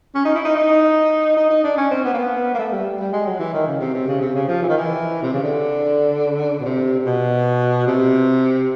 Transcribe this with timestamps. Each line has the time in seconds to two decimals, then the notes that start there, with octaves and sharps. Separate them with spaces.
0.15 C#4
0.25 D#4
0.35 E4
0.45 D#4
0.55 D#4
1.37 D#4
1.50 D#4
1.64 D4
1.78 C#4
1.91 C4
2.04 B3
2.14 A#3
2.18 B3
2.54 A#3
2.59 A3
2.72 G3
3.00 G3
3.13 G#3
3.26 F#3
3.40 E3
3.53 D#3
3.67 C#3
3.81 C3
3.94 C3
4.08 C#3
4.21 C3
4.35 C#3
4.48 F3
4.62 E3
4.69 D#3
4.77 E3
5.23 C3
5.33 C#3
5.43 D3
6.60 B2
6.65 C3
7.00 C3
7.06 B2
7.87 C3